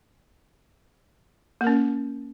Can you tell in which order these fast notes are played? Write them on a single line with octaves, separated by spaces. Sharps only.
A#3 A#4 C#4